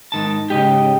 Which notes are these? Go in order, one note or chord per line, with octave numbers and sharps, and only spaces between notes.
G#2 D#3 A5
G#2 C#3 G4 D#5